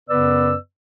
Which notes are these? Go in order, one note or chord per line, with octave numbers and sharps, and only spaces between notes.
F#2 C#3 B3 B4 D5 E6